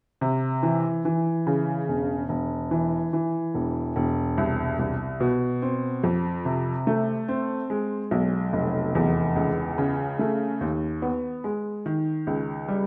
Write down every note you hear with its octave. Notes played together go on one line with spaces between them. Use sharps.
C3
E3
E3
C#3
E1
E1
E3
E3
E1
E1
C2
C2
B2
C4
F2
C3
A3
C4
G#3
B1
F1
E2
C#2
C#3
A3
D#2
B3
G#3
D#3
C#2
G3